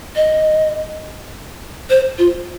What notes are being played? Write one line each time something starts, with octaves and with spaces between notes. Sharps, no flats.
D#5
C5
F4